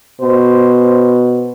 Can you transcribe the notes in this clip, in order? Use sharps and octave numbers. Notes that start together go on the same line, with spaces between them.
B2 C5